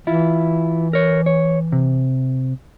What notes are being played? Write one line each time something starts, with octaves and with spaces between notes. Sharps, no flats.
E3 E4 F4
A#4 C#5
C#5
C3